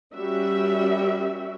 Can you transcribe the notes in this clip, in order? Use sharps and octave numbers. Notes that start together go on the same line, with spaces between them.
G3 C#4 F#4 A#4 E5